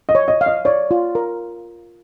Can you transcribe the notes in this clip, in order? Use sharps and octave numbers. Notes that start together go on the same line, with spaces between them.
D#5
C#5
D#5
F5
D#5
C#5 D5
F4
A#4